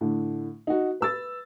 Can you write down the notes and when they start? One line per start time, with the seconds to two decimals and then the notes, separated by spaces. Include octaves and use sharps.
0.01 A2 D3
0.67 D#4 F#4
1.01 B4 E6 A6